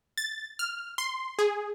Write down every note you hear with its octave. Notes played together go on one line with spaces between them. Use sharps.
A6
F6
C6
G#4